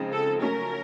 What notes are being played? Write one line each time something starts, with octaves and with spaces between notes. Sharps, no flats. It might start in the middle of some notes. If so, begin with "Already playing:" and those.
Already playing: C#3 F3 G#3 C4 D#4
A4
F#3 A3 C#4 A#4